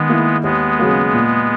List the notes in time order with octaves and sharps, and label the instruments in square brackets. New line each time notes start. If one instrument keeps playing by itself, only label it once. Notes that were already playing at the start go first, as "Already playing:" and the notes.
Already playing: [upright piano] D#3 [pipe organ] G#3 B3
[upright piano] A#3 E4
[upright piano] D#2 [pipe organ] G#3 B3
[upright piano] C#3 F#3 A#3
A#2